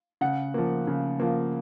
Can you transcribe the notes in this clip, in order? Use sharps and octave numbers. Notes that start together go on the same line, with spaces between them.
C#3 F#5
F3 A#3
C#3
F3 A#3